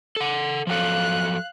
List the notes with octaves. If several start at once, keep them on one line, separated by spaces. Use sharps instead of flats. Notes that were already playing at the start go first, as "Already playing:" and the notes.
A4 F#5
F3 F#3 A4 F5 F#6